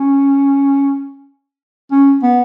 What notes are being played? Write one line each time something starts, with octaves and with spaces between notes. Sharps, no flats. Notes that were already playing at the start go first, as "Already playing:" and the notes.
Already playing: C#4
C#4
B3